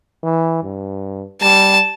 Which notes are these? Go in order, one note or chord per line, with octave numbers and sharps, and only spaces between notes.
E3
G2
G3 A5